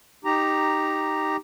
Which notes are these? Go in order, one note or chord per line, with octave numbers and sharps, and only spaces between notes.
D#4 G4 A#5